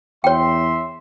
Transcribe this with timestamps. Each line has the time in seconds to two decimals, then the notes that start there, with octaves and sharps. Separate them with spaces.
0.24 E2 C#5 E5 G5 C6